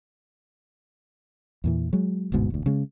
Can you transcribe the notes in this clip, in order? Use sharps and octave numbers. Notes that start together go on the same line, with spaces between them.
E2 A#2 E3
F#3 G#3
G1 D2 G#2 B2
E1 D2
C#3 G#3